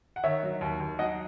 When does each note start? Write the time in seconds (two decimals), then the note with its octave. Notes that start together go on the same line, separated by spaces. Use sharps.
0.16 F#5
0.23 D#3 C#5 E5
0.43 F#3
0.61 D#2
0.80 D#2
0.99 F#3 D#5 F#5